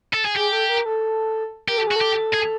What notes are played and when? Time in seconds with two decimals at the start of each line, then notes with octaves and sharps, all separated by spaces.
0.13 A4
0.25 G#4
0.36 G4 G#4
0.52 A4
0.69 A#4
0.86 A4
1.68 G4 A#4
1.77 A4
1.87 F#4 G#4
1.96 A4
2.01 G4
2.34 G#4